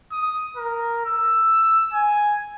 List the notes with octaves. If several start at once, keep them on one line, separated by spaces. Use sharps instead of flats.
D#6
A#4
E6
G#5